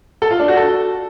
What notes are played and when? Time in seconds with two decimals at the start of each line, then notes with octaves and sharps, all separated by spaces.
0.22 A4
0.31 F4
0.39 D4
0.48 F#4
0.57 A4